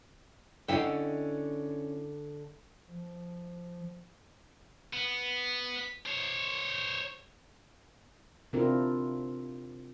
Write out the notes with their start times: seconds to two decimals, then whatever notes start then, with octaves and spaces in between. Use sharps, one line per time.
0.68 D3 C#4 E4 D#5 E5 G5
2.90 F3
4.93 B3
6.06 C5 C#5
8.53 C3 C4 D4 E4 F4 A#4